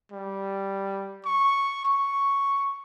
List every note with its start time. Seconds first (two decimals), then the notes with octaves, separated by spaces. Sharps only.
0.11 G3
1.25 C#6
1.85 C#6